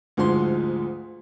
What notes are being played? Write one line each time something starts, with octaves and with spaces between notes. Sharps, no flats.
D2 G#2 F3 G#3 C6